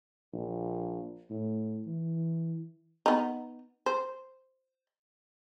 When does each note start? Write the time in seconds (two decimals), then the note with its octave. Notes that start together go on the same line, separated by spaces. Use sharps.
0.33 A#1
1.30 A2
1.86 E3
3.06 B3 D#4
3.86 C5